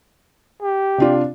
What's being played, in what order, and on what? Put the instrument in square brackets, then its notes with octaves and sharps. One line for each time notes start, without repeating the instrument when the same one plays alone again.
[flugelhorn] G4
[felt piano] C3 D4 F4